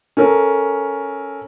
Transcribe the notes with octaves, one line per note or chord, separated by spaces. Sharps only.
C#4 A4 A#4